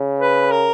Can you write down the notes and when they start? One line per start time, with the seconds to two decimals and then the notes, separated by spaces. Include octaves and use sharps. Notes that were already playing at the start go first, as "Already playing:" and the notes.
Already playing: C#3
0.19 B4
0.51 A#4